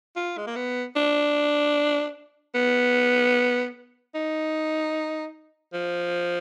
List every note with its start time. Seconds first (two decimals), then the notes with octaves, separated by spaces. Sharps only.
0.16 F4
0.37 G#3
0.47 A#3
0.56 B3
0.96 D4
2.55 B3
4.15 D#4
5.74 F3